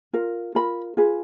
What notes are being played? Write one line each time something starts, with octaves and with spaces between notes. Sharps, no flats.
F4 A#4
F4 A#4 B5
F4 G#4 B4